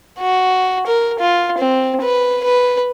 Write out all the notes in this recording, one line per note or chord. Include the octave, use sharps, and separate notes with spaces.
F#4
A#4
F4
C4
B4
B4